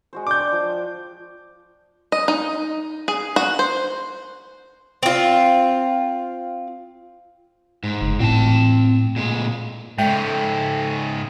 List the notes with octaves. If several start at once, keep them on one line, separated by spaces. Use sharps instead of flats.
G#3 F#4 C5
D4 G5 C#6 D6 G6
C5 D5
F3
D#5
D#4
G#4
F#4
C5
C4 F4
G#2
F#1
A2 C4 A5
A#2 G#3
G#2 C#3 G#3 A4 E5 G5 F7